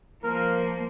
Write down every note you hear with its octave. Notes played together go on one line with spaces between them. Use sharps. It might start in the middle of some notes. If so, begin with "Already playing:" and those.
F3 A#3 A#4